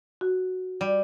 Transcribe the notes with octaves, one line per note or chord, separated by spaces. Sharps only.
F#4
G3